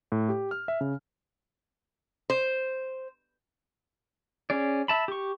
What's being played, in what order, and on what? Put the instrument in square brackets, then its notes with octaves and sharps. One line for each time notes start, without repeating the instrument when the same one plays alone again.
[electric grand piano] A2
G4
F6
E5
C#3
[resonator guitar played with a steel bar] C5
[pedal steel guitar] C#4 G#4 D5
E5 A5 B5
G4 C#6